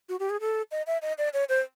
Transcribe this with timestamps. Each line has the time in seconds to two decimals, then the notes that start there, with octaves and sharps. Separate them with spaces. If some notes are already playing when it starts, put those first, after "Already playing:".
0.09 F#4
0.19 G4
0.30 G#4
0.40 A4
0.71 D#5
0.87 E5
1.02 D#5
1.18 D5
1.33 C#5
1.49 C5